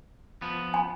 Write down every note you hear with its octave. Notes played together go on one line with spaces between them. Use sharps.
F3 B3
G#5 B5